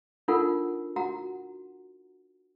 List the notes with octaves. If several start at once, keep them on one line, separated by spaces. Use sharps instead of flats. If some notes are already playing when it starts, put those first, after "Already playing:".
D4 D#4 F4 A4 A#4 F#5
F#4 F#5 A#5